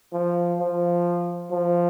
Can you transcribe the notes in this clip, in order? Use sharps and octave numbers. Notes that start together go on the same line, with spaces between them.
F3
F3
F3